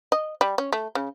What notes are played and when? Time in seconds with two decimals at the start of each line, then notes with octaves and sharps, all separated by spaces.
0.12 D#5
0.41 G3
0.58 C#4
0.72 A3
0.95 C#3